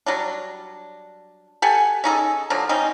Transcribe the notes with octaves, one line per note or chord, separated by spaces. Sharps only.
F#3 G3 D4
G4 A4 F#5 G#5
C#4 D#4 G#4 A4
D3 F3 F#3 A#3
C3 G3 C#4 D#4